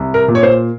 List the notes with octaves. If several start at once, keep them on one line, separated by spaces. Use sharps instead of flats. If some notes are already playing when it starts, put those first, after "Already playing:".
Already playing: C2
A#4
A#2
C#5
C5